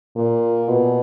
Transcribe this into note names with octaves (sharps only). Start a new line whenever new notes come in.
A#2
B2